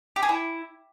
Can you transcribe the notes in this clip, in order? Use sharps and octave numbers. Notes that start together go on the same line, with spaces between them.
G4
G#4
E4